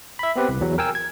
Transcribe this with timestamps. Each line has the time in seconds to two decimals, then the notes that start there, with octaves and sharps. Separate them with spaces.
0.19 E5 B5
0.36 B3 C4 G4 B4
0.49 C2
0.61 E2 F#3
0.78 A#4 G5 G#5 E6
0.95 G#6